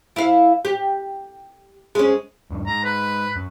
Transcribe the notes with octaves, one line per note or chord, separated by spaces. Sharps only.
E4 F5
G4
G#3 C#4
D#1 G2
G#2 A#5
B4
F#2